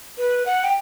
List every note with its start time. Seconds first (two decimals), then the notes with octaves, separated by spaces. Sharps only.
0.18 B4
0.46 F#5
0.64 G5